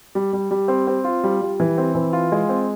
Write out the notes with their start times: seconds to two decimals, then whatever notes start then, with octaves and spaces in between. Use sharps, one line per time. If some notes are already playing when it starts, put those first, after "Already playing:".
0.15 G3
0.33 G3
0.51 G3
0.68 C4
0.87 C4
1.04 F4
1.24 G3
1.42 G3
1.60 E3
1.78 C4
1.95 E3
2.13 F4
2.32 G#3
2.49 C4